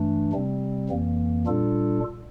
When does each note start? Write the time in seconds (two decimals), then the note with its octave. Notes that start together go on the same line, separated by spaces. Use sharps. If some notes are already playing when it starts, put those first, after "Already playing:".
Already playing: G2 E3 A3 D4
0.33 C3 G3 C4
0.90 F2 E3 A#3
1.46 A#2 G3 D4 F4 A4